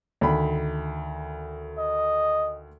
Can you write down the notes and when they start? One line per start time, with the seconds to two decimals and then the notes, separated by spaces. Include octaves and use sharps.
0.21 D2 D#3 B5
1.78 D#5